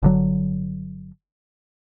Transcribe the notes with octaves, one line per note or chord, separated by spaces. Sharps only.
G1 D3 F#3